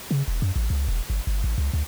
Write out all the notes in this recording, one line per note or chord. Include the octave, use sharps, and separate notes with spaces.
C#3
E1
F#2
A1
C#2
E1
G1
G1
A1
C#2
D2